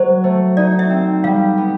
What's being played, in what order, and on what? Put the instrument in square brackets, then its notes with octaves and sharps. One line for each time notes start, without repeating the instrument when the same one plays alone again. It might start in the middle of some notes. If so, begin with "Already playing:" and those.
Already playing: [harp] F#3 [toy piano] C5
[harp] A3
[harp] D#4 [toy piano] D5
[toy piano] E5
[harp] C4
[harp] G3 [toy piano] F5
[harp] B3